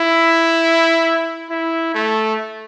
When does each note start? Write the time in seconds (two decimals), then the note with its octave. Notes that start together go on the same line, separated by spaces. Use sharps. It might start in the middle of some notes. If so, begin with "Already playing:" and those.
Already playing: E4
1.50 E4
1.94 A3